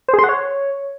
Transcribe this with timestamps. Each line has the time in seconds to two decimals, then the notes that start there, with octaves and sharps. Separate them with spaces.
0.09 C5
0.14 G#4
0.19 C6
0.24 F#5
0.29 C#5